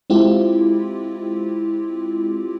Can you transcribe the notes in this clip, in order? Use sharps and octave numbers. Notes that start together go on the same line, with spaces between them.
G#3 C4 E4 F4 G4